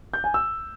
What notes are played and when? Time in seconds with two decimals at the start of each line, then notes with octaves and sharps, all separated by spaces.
0.14 G6
0.24 G#5
0.34 E6